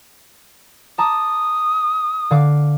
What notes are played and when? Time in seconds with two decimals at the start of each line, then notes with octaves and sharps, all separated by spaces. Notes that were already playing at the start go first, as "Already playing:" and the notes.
0.98 A5 A#5 D6 D#6
2.31 D3 F5 D6